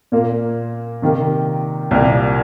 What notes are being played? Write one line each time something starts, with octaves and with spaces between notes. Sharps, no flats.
A#2 A#3 F4 A#4
C3 D#3 A#3 G4 A#4
C2 A#2 A#3 G4 A#4